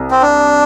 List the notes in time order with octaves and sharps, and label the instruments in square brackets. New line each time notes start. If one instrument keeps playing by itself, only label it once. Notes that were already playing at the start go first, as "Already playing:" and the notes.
Already playing: [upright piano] C2 C3
[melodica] C4
D4